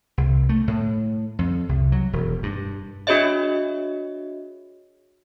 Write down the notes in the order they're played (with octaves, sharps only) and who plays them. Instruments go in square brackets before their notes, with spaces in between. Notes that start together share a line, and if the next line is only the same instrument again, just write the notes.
[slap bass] C2
A3
A2
F2
C2
F#3
E1
G2
[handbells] D4 F#4 G#4 C#5 D#5 E5